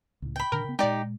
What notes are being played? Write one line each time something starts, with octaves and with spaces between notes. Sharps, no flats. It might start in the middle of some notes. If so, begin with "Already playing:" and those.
C#2 A2
G5 B5
A#2 D3 D4 A#4
C#3 B3
A#2 G#3 D#4 G4 D5 G5